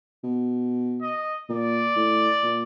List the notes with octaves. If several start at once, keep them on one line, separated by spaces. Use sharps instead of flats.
B2
D#5
A#2 D5
A2
A#2